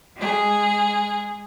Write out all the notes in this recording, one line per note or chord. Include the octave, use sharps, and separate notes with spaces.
G#3 G#4